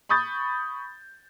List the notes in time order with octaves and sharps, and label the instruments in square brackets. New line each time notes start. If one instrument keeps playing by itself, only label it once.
[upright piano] B5 C#6 D#6 G6 A6